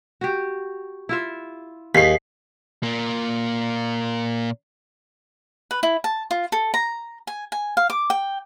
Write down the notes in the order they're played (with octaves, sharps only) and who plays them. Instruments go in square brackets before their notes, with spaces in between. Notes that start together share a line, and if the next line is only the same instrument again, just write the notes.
[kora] F#4 G4
E4 F4 E5
[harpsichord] D#2 [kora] G#4 D#5 [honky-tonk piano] B6 C7
[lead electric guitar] A#2 A#3
[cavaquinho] B4
E4
A5
F4
A4
A#5
G#5
G#5
F5
D6
G5